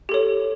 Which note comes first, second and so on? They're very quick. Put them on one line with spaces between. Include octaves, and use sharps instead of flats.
G4 A4 C#5